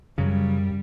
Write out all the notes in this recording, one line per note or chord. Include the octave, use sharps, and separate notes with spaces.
F#2 C#3 F#3 G3